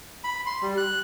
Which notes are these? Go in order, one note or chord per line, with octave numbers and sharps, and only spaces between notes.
B5
C6
G3
F#6